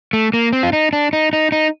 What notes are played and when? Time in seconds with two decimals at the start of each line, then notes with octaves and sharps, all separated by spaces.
0.13 A3
0.34 A#3
0.53 C4
0.63 F4
0.73 D#4
0.93 D4
1.13 D#4
1.33 D#4
1.52 D#4